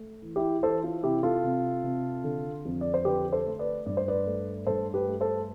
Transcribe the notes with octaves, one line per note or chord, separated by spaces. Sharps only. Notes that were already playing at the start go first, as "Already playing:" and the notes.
Already playing: A3
E3
E4 G4
E3 A4 C5
F4
C3 E4 G4
F4 A4
C3
C3
D3
F2
D5
C5
D3 G4 B4
A4 C5
A3
B4 D5
G2 D5
C5
B4 D5
A3
G2 A4 C5
G4 B4
A3
A4 C5